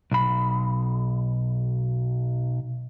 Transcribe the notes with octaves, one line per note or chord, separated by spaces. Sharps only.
B1 B5